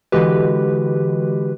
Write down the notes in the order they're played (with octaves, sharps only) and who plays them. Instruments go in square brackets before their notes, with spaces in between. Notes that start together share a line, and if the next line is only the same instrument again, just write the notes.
[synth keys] D3 E3 G#3 F#4 G4 B4